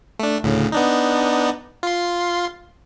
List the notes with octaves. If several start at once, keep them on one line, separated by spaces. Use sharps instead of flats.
A3 D4
D2 A2 C#3
B3 D4 D#4
F4 C6